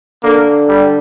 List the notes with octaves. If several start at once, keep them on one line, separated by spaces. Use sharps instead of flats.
D3 A#3
G3